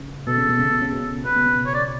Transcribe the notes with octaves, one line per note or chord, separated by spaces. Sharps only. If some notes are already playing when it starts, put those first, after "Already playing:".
Already playing: C#3
B2 A4
C#3
B2
C#3
B2
C#3
B2
C#3 B4
B2
C#3
C#5
D5